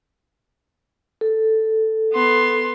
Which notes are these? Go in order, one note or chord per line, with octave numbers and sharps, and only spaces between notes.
A4
B3 C6